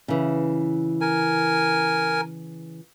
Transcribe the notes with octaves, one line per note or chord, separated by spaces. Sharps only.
C#3 E3
A#4 G#5